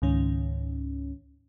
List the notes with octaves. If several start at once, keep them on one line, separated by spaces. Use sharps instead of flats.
C#2 G#2 D#3 C#4